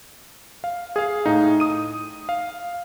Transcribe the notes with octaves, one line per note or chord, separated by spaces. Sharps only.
F5
G#4 F5
A2 D#4
D#6 D#7
F5